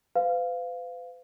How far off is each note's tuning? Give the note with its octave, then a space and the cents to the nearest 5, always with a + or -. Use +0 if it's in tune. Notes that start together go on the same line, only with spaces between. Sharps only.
B4 +45 F5 +0